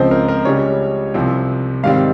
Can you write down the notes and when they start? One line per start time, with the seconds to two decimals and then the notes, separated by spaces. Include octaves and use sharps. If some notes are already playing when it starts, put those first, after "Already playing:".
Already playing: C#2 C#3 F3 C4 C5
0.11 A#4
0.29 A#4
0.45 C#2 C#3 G3 C#4 C#5
1.14 C2 C3 F3 C4
1.83 G#2 D#3 G3 C4 F5